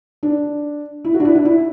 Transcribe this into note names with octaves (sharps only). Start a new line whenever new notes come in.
D4
E4
F#4
D4
E4
D4
E4